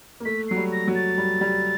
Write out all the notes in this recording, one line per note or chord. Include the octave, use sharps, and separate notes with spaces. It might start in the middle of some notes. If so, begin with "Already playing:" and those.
A#3
A3 B6
F#3 C7
G3
A#6
F#3
A6
G3
G3